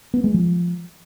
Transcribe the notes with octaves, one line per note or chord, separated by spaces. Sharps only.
B3
G#3
F3